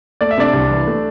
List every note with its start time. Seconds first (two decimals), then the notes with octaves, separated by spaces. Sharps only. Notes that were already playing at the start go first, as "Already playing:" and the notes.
0.21 A3 D5
0.31 E5
0.38 C3 D4 D5
0.53 C2
0.70 E3
0.87 A3